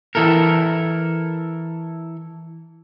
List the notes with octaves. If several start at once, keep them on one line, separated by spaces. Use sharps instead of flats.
E3 E4 A4 A#4